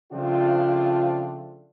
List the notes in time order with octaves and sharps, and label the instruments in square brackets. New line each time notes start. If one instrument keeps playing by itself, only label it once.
[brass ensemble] C#3 F3 A3 C4 D4 F4